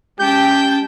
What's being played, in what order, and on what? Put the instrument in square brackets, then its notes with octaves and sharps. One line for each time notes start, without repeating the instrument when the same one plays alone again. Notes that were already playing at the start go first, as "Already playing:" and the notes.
[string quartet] G#3 G5 A5 [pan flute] C#4 [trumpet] G4 [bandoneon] G6